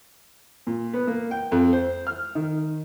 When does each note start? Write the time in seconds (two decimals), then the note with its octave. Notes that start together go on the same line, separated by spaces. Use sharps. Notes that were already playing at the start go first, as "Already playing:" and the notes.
0.67 A#2
0.94 B3
1.07 A#3
1.31 G5
1.51 F2
1.73 C5
2.07 F6
2.35 D#3